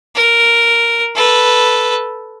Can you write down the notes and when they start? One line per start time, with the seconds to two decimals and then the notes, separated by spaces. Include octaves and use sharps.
0.16 A#4
1.16 A4 B4